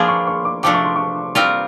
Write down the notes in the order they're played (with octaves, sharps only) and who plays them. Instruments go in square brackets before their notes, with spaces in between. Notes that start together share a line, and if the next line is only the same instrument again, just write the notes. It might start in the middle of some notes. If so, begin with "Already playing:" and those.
Already playing: [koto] F3 A#3 D4 F4 G#4 [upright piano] B5 C6 D6
[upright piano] C#6
C#6
D6
[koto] C3 F3 A3 D4 [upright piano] D6
[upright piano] C#6
C6
C#6
[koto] G3 C4 F4 A#4